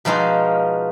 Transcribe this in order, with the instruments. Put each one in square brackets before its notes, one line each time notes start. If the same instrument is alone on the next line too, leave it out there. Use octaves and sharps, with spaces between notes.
[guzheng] B2 F3 G#3 D#4 F4